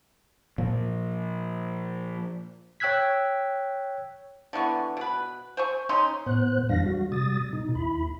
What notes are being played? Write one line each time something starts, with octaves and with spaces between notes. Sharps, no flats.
A#2 F3
C#5 G5 E6 F#6 G#6 B6
D3 E3 B3 C#6
B2 B4
C5 G#5 C#6
C#3 C#4 D#4 C6
A2 B3 C5 F#6
F2 E3 G3 D4 F5 A#6
G3 F#4
C3 G3 D#6 A6
B2 D#4
D#2 E4 B5